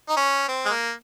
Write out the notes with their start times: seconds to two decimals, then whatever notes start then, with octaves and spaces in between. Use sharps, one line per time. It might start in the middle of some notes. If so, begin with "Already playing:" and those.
0.08 D#4
0.17 C#4
0.48 C4
0.65 G#3
0.70 A#3